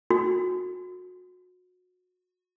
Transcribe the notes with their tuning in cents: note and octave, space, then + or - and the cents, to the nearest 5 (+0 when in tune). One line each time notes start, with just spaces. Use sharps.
F#4 -30